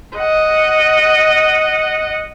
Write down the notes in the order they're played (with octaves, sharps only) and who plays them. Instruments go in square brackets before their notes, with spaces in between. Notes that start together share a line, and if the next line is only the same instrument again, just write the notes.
[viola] D#5 F#5